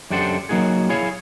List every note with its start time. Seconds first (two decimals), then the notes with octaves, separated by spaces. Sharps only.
0.10 F#2 D4 G4 A4 C5 F#5
0.49 F#3 A#3 D#4 F#4 G#4
0.89 E4 G#4 C#5 F5